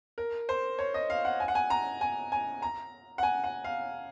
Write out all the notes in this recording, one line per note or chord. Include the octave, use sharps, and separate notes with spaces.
A#4
C5
C#5
D#5
F5
F#5
G#5
F#5
G#5
A#5
G#5
G#5
A#5
F#5
G#5
F#5
F5